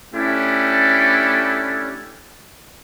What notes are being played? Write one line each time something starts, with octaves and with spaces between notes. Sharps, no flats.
A3 C#4 D4 E4 G4 A4